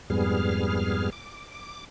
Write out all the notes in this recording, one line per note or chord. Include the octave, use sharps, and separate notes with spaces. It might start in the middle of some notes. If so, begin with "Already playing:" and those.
F2 G#2 G3 B3 G#4 F6
D6